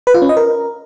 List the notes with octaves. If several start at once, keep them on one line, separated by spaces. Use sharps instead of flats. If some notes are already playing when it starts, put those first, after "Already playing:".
B4
F4
C#4
D#5
A#4